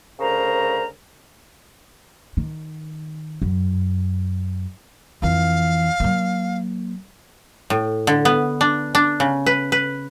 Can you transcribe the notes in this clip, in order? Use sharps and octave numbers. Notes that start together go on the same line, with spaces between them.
D2 C#3 A#4 C5 A#5
D#3
F#2
F2 E3 F5
F#3 A#3
A2
D3
B3
D4
D4
C#3
B4
B4